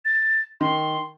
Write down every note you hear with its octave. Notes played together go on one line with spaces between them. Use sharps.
A6
D#3 C6